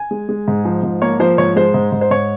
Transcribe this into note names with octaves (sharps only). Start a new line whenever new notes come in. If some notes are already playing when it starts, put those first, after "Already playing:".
Already playing: G#5
G#3
G#3
G#2
F3
G#2
A#3 C#5
F3 C5
G#2 C#5
G#3 C5
G#2
G#2
C5
G#2 C#5